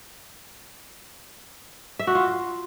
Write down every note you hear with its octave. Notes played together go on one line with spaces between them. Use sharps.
E5
F#4
F4